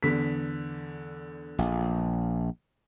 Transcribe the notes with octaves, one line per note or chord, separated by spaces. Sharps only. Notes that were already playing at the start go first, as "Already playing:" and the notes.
E2 D3 B6
A#1